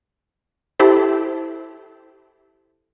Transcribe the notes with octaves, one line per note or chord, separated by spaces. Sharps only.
E4 G4 A4 C5